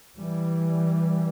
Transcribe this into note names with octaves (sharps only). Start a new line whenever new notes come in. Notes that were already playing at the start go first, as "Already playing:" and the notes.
E3 G3